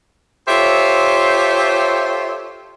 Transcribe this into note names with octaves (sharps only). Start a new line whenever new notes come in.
F4 G4 A4 C5 C#5 E5